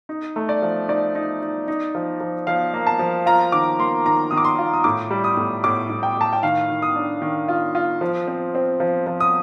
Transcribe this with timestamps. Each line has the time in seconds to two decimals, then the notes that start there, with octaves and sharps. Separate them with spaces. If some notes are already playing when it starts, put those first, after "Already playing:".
0.09 D#4
0.36 A3
0.49 D5
0.62 F3
0.88 D#4 D5
1.15 D#4
1.42 D#4
1.68 D#4
1.95 F3
2.20 F3
2.47 F3 F5
2.74 A#3
2.87 A5
2.99 F3
3.26 F4 A#5
3.52 D#3 D6
3.79 A#3 C6
4.06 D#3 A#5
4.31 D#3 D#6
4.37 D6
4.45 C6
4.58 F4
4.73 D#6
4.84 A2 D6
5.10 G3
5.24 D#6
5.37 A2
5.64 A2 D6
5.90 A2
6.03 G5
6.17 A2 A5
6.33 G5
6.43 D#3 F5
6.70 D#3
6.82 D#6
6.96 D4
7.22 D#3
7.48 F4
7.75 F4
8.01 F3
8.27 C4
8.55 C4
8.80 F3
9.06 F3
9.20 D#6